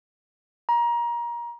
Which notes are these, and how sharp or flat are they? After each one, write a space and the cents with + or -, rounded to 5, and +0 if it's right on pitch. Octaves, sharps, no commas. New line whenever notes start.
A#5 +25